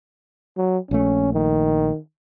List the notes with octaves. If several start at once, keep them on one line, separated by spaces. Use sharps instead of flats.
F#3
A#1 A3 C#4
D#3